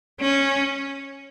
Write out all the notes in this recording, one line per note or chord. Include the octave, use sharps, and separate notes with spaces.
C#4